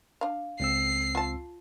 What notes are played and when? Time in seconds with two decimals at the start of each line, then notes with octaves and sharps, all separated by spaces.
0.21 D4 F5
0.60 C#2 C4 E6 C7
1.15 F4 A5